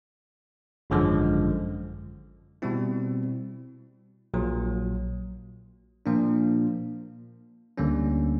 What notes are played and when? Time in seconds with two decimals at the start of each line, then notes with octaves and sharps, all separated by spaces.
0.90 G#1 F#2 D3 F3 G#3
2.62 B2 G3 C4 E4
4.34 A#1 A#2 F#3
6.06 A#2 F3 A#3 D4
7.78 D2 D3 G3 A#3 C#4